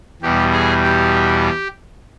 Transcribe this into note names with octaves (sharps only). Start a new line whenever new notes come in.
E2 B2 G3 G4
G#4
G4